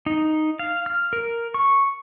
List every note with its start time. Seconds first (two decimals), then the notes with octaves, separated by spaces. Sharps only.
0.06 D#4
0.59 F5
0.86 F6
1.13 A#4
1.54 C#6